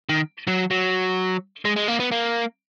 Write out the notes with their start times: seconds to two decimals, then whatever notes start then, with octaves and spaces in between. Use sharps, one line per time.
0.09 D#3
0.48 F#3
0.71 F#3
1.65 G#3
1.76 G#3
1.88 A#3
2.00 B3
2.12 A#3